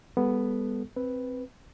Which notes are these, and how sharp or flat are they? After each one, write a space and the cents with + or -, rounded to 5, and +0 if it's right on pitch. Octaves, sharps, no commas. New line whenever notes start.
G3 +45 B3 +0 A4 +0
C4 +0 B4 +0